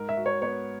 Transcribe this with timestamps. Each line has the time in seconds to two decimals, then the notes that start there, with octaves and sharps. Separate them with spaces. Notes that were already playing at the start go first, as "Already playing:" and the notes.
Already playing: G#2 A#4
0.09 E5
0.17 F#4
0.26 C#5
0.42 B3 C#5